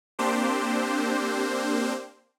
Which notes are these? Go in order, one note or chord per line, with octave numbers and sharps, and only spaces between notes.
A#3 C4 D4 G4 C5